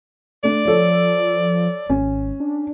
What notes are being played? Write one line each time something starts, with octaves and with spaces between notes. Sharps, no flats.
A3 D4 D5
F3 A4 C#5
G#1 C#4
D4